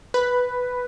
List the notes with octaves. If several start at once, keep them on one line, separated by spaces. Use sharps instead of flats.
B4